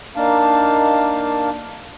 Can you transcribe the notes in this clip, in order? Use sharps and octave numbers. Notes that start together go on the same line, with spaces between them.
A#3 D4 D#4 F5 A5